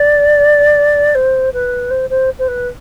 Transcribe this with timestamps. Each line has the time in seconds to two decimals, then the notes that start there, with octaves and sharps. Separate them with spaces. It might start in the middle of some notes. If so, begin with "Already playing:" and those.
Already playing: D5
1.15 C5
1.53 B4
1.90 C5
2.10 C5
2.39 C5
2.48 B4